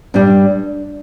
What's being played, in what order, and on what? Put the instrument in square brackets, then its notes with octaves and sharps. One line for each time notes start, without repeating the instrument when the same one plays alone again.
[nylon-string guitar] G2 G3 D4